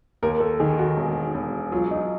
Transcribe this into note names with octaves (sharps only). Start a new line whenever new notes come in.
D#2 A#4
A4
D#3 G#4
F#4
E1
E1
F#3 F4
D#4